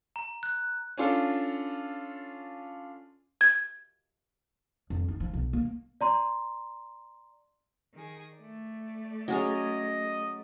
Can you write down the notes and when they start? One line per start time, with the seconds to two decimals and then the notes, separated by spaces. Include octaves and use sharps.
0.16 A#5
0.43 F#6
0.97 C#4 D4 F4 A4
3.41 G#6
4.90 F2
5.08 D#4
5.20 F3
5.34 B1
5.53 A#3
6.01 D5 A#5 C6
7.94 D#3 G#4
8.35 A3 D5
9.28 F#3 C#4 G#4 D#5